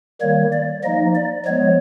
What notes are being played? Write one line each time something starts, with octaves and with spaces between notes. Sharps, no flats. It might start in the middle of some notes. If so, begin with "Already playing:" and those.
D#3 G3 A#3 C#5
D5
F3 A#3 D#4 D#5
D5
F3 G#3 B3 C#5